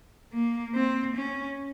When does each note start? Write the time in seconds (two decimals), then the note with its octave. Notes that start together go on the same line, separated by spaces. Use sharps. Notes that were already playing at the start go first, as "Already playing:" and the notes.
0.34 A#3
0.75 C4
1.16 C#4